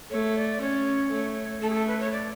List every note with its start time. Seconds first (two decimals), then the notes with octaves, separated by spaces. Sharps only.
0.10 A3 C#5
0.35 D5
0.60 C#4 C#5
1.11 A3
1.61 A3 A4
1.69 G#4
1.74 A4
1.87 B4
2.00 C#5
2.12 D5